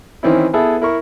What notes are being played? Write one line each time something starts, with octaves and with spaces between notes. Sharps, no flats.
D#3 E3 C4 C#4 E4
B3 E4 G#4 A4 E5
E4 A#4 C#6